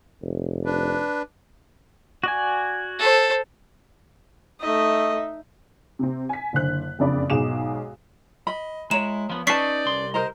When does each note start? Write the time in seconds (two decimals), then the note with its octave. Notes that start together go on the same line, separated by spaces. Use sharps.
0.22 F1
0.65 D4 B4
2.24 F#4 D5 G#5
2.99 A4 C5
4.60 A3 D#4 D#5 E5
5.99 C3 C4
6.29 G#5 B6
6.53 F#1 D3 C5 F#6
6.99 F#1 F2 C#3 D4 D5 B5
7.30 B1 G#2 G#4 D6 E7
8.47 D#5 B5
8.91 G#3 E4 C#5 A#5 E7
9.29 F3 B3
9.47 C#4 D#4 B4 D5 A5 C#6 B6 C7
9.86 C2 C6
10.14 A#4 C5 D#5 A#5